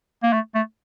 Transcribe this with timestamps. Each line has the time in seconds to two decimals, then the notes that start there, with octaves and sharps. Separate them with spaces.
0.23 A#3
0.33 A3
0.55 A3